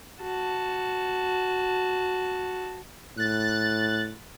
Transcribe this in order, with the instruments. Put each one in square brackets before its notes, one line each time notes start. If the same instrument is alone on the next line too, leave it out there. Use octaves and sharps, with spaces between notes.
[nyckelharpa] F#4 A5
[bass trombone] A2 [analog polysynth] F#6 A6